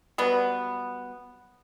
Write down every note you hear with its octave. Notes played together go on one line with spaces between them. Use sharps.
F#3 G3 B3